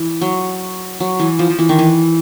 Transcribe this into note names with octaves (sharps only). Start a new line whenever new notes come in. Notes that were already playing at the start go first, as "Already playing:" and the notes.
Already playing: E3
F#3
F#3
E3
F3
F3
E3
D#3
E3